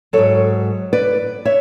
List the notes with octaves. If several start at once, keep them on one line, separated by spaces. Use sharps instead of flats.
G#2 F#3 A4 C#5
B4 D5
C#5 E5